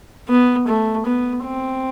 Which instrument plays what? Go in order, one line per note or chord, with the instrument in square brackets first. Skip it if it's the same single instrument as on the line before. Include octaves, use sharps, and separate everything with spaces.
[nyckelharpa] B3
A3
B3
C4